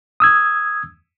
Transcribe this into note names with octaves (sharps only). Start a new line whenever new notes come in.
D#6 E6 G#6